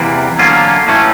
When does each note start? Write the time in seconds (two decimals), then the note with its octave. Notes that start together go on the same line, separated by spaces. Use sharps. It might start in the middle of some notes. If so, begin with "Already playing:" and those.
Already playing: E2 C3 E3 G3 A#3
0.39 D3 F#3 A#3 C#4 F4
0.88 A2 E3 A3 C#4